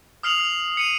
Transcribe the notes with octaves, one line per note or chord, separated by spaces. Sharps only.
D#6 F6 C7 F7 F#7
C#7 D#7 F7